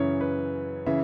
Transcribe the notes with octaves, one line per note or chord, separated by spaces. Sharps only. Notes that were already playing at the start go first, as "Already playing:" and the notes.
Already playing: F#2 C#3 E3 C#5 E5
B4
C#3 E3 E5